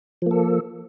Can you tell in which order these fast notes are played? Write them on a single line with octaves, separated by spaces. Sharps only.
F3 A#3 A4